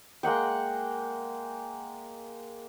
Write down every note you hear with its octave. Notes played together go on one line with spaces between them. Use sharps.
G#3 A#3 F#5 G5